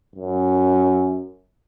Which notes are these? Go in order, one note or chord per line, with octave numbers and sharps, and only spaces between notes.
F#2